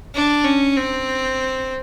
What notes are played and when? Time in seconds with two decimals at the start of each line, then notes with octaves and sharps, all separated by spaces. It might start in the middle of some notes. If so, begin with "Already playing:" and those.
0.15 D4
0.45 C#4
0.76 C4